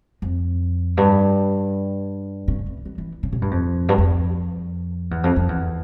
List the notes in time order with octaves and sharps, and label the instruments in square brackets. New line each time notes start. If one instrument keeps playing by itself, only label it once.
[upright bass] F2
G2
C#3
E3
E3
E3
C#3
A#2
G2
F2
G2
F2
E2
F2
F2
E2